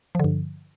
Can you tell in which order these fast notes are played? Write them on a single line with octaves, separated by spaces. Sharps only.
F3 D3 G2